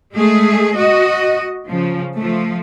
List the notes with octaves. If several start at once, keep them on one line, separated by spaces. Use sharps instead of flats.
G#3 A3 G#4
F#4 D#5
C#3 F3
F3 A3